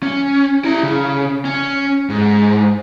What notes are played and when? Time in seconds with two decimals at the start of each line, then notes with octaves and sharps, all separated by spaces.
0.03 C#4
0.64 E4 A#5
0.83 C#3
1.45 C#4
2.10 G#2